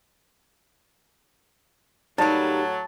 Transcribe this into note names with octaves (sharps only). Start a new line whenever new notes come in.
A2 F#3 G3 A#3 D#4 A5